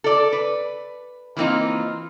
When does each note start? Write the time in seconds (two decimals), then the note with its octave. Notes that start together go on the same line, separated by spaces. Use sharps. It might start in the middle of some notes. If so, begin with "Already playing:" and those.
0.04 A4 D5
0.32 B4
1.37 E3 A#3 C4 D#4 F4